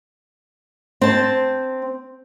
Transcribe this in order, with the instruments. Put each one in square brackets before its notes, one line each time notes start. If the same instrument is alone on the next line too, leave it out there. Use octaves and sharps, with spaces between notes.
[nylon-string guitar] C4 A5